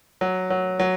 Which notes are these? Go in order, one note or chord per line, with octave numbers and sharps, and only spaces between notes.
F#3
F#3
F#3